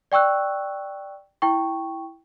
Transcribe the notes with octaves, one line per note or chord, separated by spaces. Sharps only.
D5 G5 C#6 E6 F#6
E4 G5 C#6